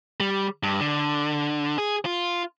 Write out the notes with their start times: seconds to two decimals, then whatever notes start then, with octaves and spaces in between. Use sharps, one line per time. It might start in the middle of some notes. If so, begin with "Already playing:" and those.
0.20 G3
0.63 G2
0.81 D3
1.78 G#4
2.05 F4